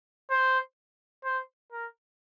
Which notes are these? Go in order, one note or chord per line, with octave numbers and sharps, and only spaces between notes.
C5
C5
A#4